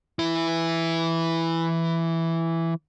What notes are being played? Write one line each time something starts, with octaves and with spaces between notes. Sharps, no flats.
E3 E4